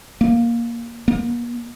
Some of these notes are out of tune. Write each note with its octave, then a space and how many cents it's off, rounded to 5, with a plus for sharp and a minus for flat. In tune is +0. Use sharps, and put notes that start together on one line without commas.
A#3 +10
A#3 +40